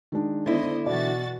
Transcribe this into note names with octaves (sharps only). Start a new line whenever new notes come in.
D#3 G#3 D4
D3 B3 E4 C5 D#5
B2 E3 F#4 D5 A6